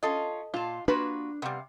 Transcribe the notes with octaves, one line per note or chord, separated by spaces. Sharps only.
C#4 F4 A4 D#5
A#2 F4 A5
A#3 D4 F4 F#4 B4
C3 G3 B3 F5